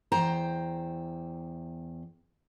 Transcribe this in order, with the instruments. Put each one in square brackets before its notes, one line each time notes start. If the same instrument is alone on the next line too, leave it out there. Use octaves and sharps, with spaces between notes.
[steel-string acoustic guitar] E2 C5 G5 A#5